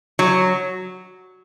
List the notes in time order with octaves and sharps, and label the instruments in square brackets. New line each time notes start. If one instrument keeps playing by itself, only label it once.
[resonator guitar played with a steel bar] F#3